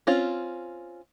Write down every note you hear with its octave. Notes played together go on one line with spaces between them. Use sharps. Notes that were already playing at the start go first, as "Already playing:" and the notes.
C4 C#4 F4